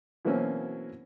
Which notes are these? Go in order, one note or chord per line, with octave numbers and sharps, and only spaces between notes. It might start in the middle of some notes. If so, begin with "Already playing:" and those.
B2 E3 F#3 A#3 C4 C#4